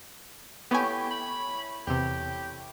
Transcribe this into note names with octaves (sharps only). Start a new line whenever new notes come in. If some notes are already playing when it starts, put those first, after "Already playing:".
A3 B3 E4 G4 C#5 G#5
B5
E2 C3 G4